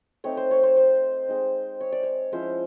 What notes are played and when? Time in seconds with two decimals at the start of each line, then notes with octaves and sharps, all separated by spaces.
0.24 A3 C4 D#4 C#5
0.37 C5
0.51 C#5
0.63 C5
0.77 C5
1.28 G#3 C4 D#4
1.81 C#5
1.92 D5
2.03 C#5
2.32 F3 G#3 C#4 E4 C5